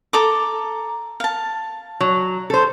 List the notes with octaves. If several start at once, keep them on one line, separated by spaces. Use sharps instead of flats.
A4 A#5 D6
F5 A5
F#3
A4 C5